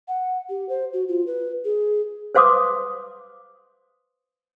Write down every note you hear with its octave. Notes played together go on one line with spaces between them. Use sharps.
F#5
G4
C5
F#4
F4
B4
G#4
B4 C5 F5 C6 D6 D#6